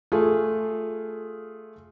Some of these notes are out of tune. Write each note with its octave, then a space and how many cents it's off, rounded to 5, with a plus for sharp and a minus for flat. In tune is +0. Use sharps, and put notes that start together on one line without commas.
A3 +0 F4 +5 G#4 +0